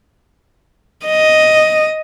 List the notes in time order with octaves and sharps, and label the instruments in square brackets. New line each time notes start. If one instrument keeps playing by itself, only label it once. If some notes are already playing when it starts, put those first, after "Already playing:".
[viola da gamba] D#5